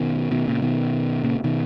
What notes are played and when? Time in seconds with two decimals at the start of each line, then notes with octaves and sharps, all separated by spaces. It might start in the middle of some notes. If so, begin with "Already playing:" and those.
Already playing: B2 D#3
0.31 B2 D#3
0.47 A#2 C#3
0.62 B2 D#3
1.24 A#2 C#3
1.44 B2 D#3